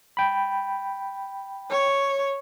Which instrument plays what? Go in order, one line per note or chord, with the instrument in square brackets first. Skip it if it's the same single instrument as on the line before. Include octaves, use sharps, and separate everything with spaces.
[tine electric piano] G5 B5
[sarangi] C#5